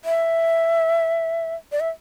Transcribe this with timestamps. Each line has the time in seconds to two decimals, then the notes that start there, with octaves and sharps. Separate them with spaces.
0.05 E5
1.72 D5
1.80 E5